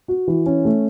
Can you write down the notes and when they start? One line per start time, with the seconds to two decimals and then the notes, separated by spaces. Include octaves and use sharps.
0.08 F#4
0.28 E3
0.46 C#4
0.65 A3